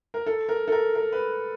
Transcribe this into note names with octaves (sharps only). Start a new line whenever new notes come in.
A#4
A4
A#4
A4
A#4
A#4
B4